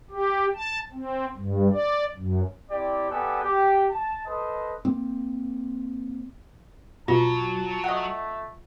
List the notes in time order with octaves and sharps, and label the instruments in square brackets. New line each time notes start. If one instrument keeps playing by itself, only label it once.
[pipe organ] G4
A5
C4
G2
D5
F#2
[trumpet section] C4 E4 G4 D5
B3 G4 A4 D5 F#5 G#5
G4
A5
A4 B4 C5 D#5
[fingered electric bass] A#3 C4
[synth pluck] B2 [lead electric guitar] F#3 [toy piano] F4 [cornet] A5
[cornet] A3 [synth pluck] D#5 F#5